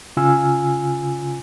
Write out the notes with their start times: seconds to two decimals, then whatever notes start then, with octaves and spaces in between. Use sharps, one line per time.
0.17 C#3 F4 G#5 E6 F6